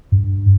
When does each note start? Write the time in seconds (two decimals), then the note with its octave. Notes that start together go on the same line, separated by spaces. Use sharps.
0.12 G2